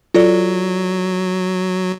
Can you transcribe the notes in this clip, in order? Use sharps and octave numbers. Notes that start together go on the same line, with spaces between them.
F#3 F4 A4 D5